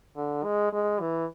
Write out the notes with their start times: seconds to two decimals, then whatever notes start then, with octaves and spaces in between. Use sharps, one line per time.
0.16 D3
0.44 G#3
0.73 G#3
1.00 E3